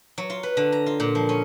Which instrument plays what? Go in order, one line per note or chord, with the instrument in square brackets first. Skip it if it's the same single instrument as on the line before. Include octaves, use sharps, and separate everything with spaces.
[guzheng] F#3
F4
B4
D3
A#5
F4
A#2
F3
C#4